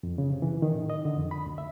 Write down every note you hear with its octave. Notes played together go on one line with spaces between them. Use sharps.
F2
C#3
C3
E3
D#3
A2
D#5
D3
F2
B5
D2
E5